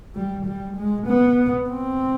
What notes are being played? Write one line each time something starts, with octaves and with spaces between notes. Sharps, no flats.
G3
G3
G#3
B3
C4